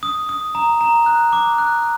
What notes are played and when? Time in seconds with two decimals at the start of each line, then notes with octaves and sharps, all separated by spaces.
0.03 D#6
0.29 D#6
0.55 A#5
0.81 A#5
1.06 F#6
1.33 D6
1.58 F#6